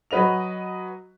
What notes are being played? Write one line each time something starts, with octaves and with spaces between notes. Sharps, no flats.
F#3 F#4 B4 D#5 F7